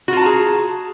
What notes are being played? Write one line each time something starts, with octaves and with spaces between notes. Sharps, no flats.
F4 F#4 G#4 A5 A#5